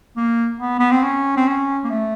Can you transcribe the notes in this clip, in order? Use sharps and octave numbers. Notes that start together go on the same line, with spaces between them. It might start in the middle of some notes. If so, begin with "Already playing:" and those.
A#3
B3
B3
C4
C#4
C4
C#4
A#3
A3